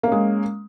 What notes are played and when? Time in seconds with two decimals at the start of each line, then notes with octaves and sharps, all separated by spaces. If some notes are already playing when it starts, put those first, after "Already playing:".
0.03 A#3
0.08 C#4
0.12 G#3